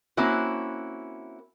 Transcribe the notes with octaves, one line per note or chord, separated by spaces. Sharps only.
A#3 C4 C#4 E4 F#4